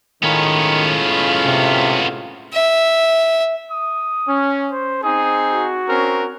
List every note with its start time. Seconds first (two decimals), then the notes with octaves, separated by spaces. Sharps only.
0.23 A2 D#3 G#3 B3 C#4 F4
1.45 C3
2.53 E5
3.72 D#6
4.29 C#4
4.71 C5
5.04 C4 D#4 G#4 D#6
5.51 F#4
5.87 C4 C#4 A#4